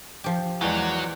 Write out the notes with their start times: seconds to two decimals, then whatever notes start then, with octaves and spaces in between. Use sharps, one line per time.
0.24 F3 G4
0.61 E2 F#3 G#3 D5